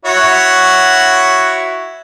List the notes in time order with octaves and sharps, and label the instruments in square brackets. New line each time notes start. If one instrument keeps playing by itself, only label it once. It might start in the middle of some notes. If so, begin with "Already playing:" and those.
[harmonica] E4 F#4 C#5